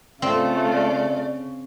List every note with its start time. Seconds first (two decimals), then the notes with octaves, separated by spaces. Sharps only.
0.22 C#3 A3 C4 F4 D5